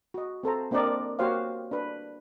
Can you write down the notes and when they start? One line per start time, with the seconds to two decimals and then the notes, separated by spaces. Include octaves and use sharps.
0.14 F#4 D#5
0.43 C4 A4 C5 A#5
0.71 A#3 C4 D4 A#4 D5 D#5
1.19 A#3 F#4 G4 C5 C#5 F5
1.71 D4 B4